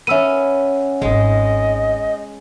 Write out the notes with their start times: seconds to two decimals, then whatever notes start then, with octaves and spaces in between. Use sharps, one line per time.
0.07 B3 C#4 E5 E6 D#7
1.02 D#1 G#1 G#3 D#5